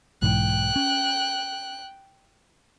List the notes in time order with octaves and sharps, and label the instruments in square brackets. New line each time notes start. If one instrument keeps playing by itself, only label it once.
[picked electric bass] B1 G#2 E3 [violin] G5 F#6
[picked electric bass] C#4